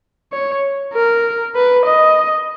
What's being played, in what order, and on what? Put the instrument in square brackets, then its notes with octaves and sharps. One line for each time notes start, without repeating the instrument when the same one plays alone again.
[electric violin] C#5
A#4
B4
D#5